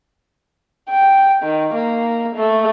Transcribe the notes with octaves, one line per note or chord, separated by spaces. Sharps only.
G5
D#3
A#3
A3